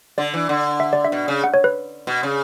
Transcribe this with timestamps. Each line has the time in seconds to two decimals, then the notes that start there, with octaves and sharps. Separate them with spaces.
0.18 D3 D5
0.34 E3
0.49 D3
0.80 E5
0.93 D5
1.05 E5
1.12 B2
1.28 C#3
1.44 F#5
1.54 C#5
1.64 B4
2.07 B2
2.23 C#3